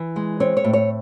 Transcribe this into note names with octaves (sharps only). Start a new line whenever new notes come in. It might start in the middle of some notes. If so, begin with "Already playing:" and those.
Already playing: E3
G#3
C4 C#5
C#5
A2
C#5